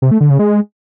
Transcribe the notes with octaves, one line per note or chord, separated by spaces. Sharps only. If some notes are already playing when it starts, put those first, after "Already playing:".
C3
A3
D3
C#3
G#3